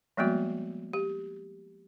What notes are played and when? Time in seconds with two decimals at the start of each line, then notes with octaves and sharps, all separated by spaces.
0.17 F3 G3 G#3 A#3 B3 F#4
0.93 G4